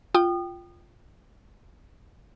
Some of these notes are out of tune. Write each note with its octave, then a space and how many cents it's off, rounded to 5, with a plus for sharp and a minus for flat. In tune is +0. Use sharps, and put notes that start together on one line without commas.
F4 +0 G5 -5 D#6 -30